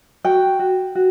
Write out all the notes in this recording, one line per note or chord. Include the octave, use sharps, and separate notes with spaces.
F#4 G5
F#4
F#4